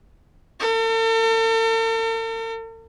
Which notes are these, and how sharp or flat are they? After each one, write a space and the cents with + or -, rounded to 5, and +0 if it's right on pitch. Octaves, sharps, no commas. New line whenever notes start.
A4 +45